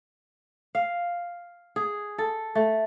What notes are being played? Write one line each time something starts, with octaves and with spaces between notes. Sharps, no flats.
F5
G#4
A4
A3